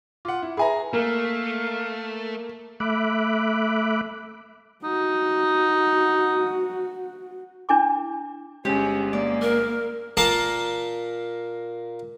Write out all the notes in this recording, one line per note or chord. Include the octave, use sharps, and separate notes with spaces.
F4 F#5 D6
E4
G#4 B4 E5 G#5 A#5 B5
A3 A#3 F5
A3 E5 B5 D6 F#6
D#4 F#4
D4 E4 G#5 D6
G1 G#3 C#4 G4
A#3 D5
A#4
A#2 A#3 A5